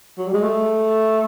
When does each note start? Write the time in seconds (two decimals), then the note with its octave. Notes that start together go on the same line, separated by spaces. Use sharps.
0.18 F#3
0.27 G3
0.34 G#3
0.43 A3